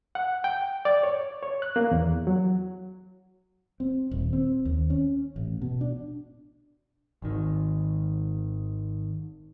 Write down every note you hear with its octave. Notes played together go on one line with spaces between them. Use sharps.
F#5
G5
D5
C#5
C#5
F#6
A#3
E2
F#3
C4
D#1
C4
D#2
C#4
A1
B2
D4
G#1 D#3